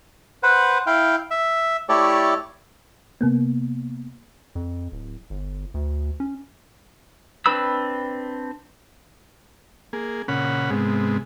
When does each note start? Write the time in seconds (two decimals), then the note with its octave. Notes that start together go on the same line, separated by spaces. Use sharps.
0.43 B4 C5 F#5
0.87 E4 F5 G5
1.31 E5
1.89 A3 E4 G4 A4 C#5 D5
3.21 C3 A#3 B3
4.55 F2
4.92 D1
5.30 G1
5.74 D2
6.20 C#4
7.46 C4 D4 B4 B5 E6
9.93 A#3 G#4
10.28 A#2 C#3 C#4 F#5 B5
10.70 G#2 C3 G#3 B3